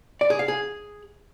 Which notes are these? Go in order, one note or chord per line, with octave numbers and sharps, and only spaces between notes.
D5
G#4
F5
G#4